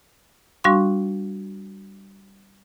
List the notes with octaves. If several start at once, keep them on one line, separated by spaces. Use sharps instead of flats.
G3 D4 F#4 F5 C6 C#6